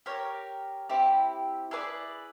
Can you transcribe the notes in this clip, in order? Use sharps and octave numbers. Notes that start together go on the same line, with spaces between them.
G4 A#4 C#5
C4 E4 G4
E4 G#4 B4 D5